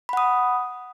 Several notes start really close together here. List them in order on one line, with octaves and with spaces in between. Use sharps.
B5 F#5 D#6